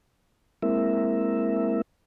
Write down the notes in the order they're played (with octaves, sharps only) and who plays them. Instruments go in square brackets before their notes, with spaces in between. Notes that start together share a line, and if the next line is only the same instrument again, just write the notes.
[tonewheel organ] G#3 A#3 C4 E4 A#4 E5